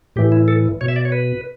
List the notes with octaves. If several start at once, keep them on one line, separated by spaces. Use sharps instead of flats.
A2 E3 G4
E4
A4
B2 C#5
E5
D5
C#5
B4